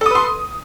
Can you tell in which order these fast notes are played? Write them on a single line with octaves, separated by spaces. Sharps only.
A4 D#6 B4 C6